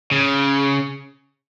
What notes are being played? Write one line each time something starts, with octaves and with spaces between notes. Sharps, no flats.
C#3